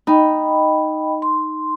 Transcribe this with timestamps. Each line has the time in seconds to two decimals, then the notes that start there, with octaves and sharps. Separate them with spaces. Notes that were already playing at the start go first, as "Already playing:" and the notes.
0.07 D#4 D#5 G5 B5
1.22 C6